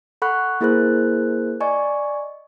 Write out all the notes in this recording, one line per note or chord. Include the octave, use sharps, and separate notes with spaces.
A4 F#5 B5 C#6 F#6
A#3 E4 G#4 A#4 C5 F#6
D5 D#5 G#5 C#6